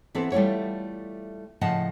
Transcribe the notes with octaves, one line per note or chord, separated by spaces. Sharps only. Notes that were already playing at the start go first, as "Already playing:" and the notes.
E3 B3 C4 A4
G3 A3 E4 F4 C#5
A2 C#3 F3 D#5 F#5 A5